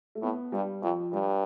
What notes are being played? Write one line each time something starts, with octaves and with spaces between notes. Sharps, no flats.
A3
A2 B3
G2 G3
F2 F3
G2 G3